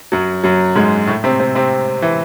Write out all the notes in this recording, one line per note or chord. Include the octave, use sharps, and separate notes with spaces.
F#2 F#3
F#2 F#3
G#2 G#3
A2 A3
C3 C4
C3 C4
C3 C4
E3